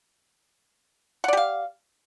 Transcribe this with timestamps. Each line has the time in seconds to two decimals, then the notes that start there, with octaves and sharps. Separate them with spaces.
1.24 F#5
1.28 D5
1.33 G4
1.37 F5